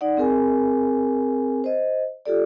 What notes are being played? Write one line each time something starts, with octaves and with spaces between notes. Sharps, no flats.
D#4 D5 F#5
C4 G#4 A#4 G#5
C5 D#5
F4 G4 A4 D5